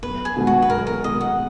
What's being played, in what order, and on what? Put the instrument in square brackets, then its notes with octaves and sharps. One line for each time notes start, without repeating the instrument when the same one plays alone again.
[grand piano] B1 [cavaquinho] B4
[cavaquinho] G#4
[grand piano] B2 G#3 B3
[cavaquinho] F#4
B4
[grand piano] B1 [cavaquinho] A#4
[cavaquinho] A#4
[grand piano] B2 G#3 B3 [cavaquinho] D#5
[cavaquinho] F#5